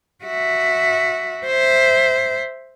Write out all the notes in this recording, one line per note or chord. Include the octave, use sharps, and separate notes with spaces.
F#4 E5
C5 E5